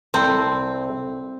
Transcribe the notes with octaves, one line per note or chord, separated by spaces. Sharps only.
C2 C4 A4